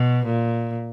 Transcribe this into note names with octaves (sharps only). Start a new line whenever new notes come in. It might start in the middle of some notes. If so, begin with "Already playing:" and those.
Already playing: B2
A#2